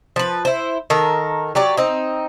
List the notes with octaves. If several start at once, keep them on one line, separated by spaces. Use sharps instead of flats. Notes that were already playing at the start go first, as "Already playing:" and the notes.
F3 B4
E4 C5
D#3 A4 A#4
F#3 G4 D5
C4 D#4